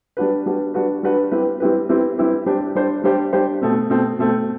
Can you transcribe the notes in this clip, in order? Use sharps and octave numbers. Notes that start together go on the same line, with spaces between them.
G3 D4 F#4 B4
G3 D4 F#4 B4
G3 D4 F#4 B4
G3 D4 F#4 B4
G3 C4 E4 G4 B4
G3 C4 E4 G4 B4
G3 C4 E4 G4 B4
G3 C4 E4 G4 B4
G3 D4 G4 C5
G3 D4 G4 C5
G3 D4 G4 C5
G3 D4 G4 C5
B2 A3 C4
B2 A3 C4
B2 A3 C4